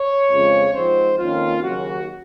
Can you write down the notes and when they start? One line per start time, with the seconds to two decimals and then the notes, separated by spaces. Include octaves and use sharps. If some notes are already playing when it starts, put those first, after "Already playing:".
Already playing: C#5
0.30 F2 C#3 F3 G#3
0.74 G#2 F3 C4 C5
1.18 F2 D#3 A#3 C#4 F4
1.63 D#2 C#3 F#3 F#4